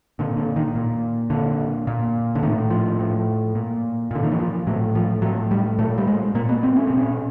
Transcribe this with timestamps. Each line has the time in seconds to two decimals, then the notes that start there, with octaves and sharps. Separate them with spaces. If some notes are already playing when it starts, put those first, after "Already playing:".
0.19 A#2 D3
0.37 D3
0.56 D#3
0.75 A#2
1.30 A#2 D3
1.87 A#2
2.35 D3
2.43 A2 D#3
2.70 F3
2.99 A2
3.55 A#2
4.11 A#2 D3
4.23 D#3
4.32 E3
4.39 F3
4.67 A2 F#3
4.95 F3
5.22 A2 F#3
5.51 G3
5.78 A#2 A3
5.98 G3
6.07 G#3
6.35 A#2 A#3
6.49 B3
6.63 C4
6.76 C#4
6.87 B2 C4
6.97 C#4